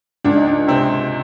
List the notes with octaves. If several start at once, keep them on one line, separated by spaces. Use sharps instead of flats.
C#2 D4
D#4
D4
C3 C4